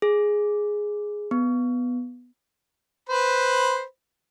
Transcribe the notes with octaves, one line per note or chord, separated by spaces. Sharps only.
G#4
B3
B4 C5 B5